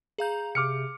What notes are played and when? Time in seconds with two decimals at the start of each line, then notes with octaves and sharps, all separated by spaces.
0.18 G#4 F5 A#5 G6
0.55 C3 D6 F6 C#7